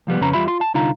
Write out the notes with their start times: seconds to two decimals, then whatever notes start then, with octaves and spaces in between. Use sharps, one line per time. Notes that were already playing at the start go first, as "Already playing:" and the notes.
0.07 C2 F3 G3 B3
0.20 F2 C#3 C#4 B4 A#5
0.33 E2 E3 G3 F4 E5 B5
0.47 F4 C6
0.61 A5
0.74 C2 D3 D#4 F4 F5 A#5